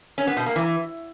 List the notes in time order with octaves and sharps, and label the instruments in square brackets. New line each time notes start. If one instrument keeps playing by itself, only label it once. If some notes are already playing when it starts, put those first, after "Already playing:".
[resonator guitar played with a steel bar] C#4
B3
B2
A#3
E3